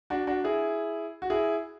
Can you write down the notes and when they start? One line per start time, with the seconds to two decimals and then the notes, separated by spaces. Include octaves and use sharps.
0.10 D4 F#4
0.27 D4 F#4
0.44 E4 G#4
1.22 F#4
1.30 E4 G#4